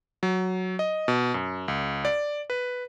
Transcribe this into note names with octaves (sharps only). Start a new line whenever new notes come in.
F#3
D#5
B2
F#2
C#2
D5
B4